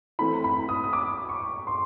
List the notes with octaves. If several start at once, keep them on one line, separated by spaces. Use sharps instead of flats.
E3 A3 C4 E4 B5
B5
D#6
D#6
D6
C#6
C6